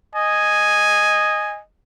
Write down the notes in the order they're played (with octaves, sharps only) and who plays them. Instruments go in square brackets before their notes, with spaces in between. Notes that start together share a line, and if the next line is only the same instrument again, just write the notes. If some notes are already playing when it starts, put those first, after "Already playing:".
[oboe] D#5 [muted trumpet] G#5